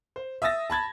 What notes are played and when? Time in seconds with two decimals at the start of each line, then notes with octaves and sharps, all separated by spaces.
0.16 C5
0.42 E5 D#6 E6 A6 A#6
0.70 A5 B5 G#6 A6